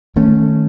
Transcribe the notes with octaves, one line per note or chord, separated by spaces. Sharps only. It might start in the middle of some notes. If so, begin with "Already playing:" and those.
D#3 A3 C#4